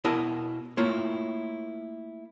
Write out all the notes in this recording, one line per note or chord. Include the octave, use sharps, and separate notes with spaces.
B2 E4 A#4 D#5 A5
A3 A#3 E4 F4 C#5